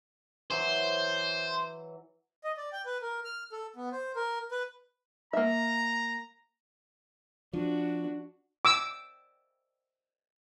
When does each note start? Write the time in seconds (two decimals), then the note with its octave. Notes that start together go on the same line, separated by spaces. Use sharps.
0.50 E3 F#3 C5
2.44 D#5
2.57 D5
2.73 G5
2.86 B4
3.02 A#4
3.25 F6
3.52 A4
3.76 B3
3.92 C5
4.16 A#4
4.51 B4
5.33 A#3 E5 A#5
7.53 F3 D4 F#4
8.65 D6 E6